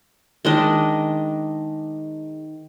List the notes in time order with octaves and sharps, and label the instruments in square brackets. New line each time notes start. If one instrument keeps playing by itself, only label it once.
[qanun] D#3 G#3 D4 D#5